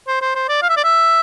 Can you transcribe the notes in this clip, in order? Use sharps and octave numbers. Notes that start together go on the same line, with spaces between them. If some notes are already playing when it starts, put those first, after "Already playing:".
C5
C5
C5
D5
F5
E5
D5
E5